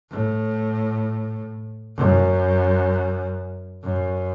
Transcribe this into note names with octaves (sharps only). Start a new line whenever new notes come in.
A2
F#2
F#2